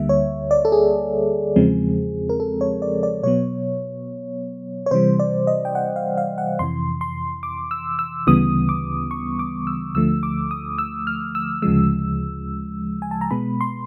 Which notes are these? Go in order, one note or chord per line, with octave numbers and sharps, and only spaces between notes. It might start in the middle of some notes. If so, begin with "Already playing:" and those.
Already playing: D2 D3 G3 A#3 E5
C#5
D5
A4
G#4
E2 C#3 F3 G#3 C4
A#4
A4
C#5
D5
D5
B2 F#3 B3 C#5
C#5
C3 E3 G3 C5
D5
D#5
G5
F#5
F5
F5
F#5
F2 C3 E3 C6
C6
D6
E6
E6
D2 C#3 E3 G3 B3 D#6
D6
C#6
D6
E6
D2 D3 F3 A3 E6
D6
D#6
E6
F6
E6
D2 C#3 F3 G#3 E6
G#5
A5
A#5
B2 G#3 B3 B5
C6